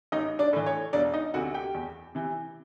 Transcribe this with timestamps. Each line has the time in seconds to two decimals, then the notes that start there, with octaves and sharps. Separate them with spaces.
0.12 A1 D#4 D#5
0.39 D4 D5
0.53 A2 E3
0.66 C#5
0.93 E1 D4 D5
1.14 D#4 D#5
1.34 D2 C3 F#4 F#5
1.54 G4 G5
1.74 E2
2.15 C3 E3